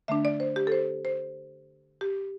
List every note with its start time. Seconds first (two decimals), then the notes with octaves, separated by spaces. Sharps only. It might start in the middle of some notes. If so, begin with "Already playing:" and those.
0.08 D3 A3 D4 E5
0.25 D5
0.40 C5
0.56 G4
0.67 A4
0.72 C5
1.05 C5
2.01 G4